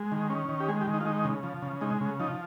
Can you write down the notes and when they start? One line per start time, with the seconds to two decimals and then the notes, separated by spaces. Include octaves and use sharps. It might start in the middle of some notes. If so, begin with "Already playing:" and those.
Already playing: G#3
0.12 D#3
0.30 C#4
0.49 D#3
0.60 G4
0.68 G#3 G#4
0.81 G4
0.87 D#3
0.94 D#4
1.01 F4
1.05 G#3 D#4
1.25 C#3
1.43 F3
1.62 C#3
1.81 G#3 D#4
2.01 C#3
2.19 F3 D#4